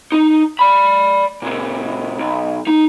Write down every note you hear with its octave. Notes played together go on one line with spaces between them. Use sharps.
D#4
D5 B5
A#2 C#3
B1
D#4